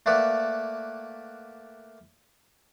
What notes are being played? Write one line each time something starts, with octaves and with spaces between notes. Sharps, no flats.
A3 A#3 B4 D5 E5 F#5